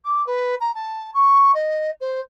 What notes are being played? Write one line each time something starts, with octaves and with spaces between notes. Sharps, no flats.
D6
B4
A#5
A5
C#6
D#5
C5